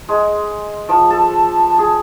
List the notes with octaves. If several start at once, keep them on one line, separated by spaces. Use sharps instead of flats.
G#3
F3
A4
G#4